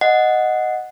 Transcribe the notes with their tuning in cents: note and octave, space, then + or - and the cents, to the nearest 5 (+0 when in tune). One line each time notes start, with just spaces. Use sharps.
D#5 -5 F#5 -5